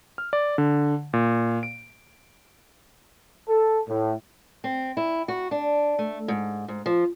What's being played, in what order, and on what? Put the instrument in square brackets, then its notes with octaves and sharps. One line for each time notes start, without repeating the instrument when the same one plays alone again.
[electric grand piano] F6
D5
D3
A#2
D7
[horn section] A4
A2
[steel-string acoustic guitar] C4
E4
F#4
D4
A3
G#2
G#2
F3